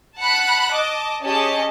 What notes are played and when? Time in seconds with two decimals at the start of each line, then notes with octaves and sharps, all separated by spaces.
0.18 F#5 A5 B5 F#6
0.72 D#5 A5 D6
1.24 C#4 G4 G#4 D#5 A5